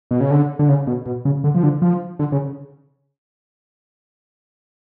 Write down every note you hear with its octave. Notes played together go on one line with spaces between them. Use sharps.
B2
C#3
D3
D3
C#3
B2
B2
C#3
D3
F3
D3
F3
D3
C#3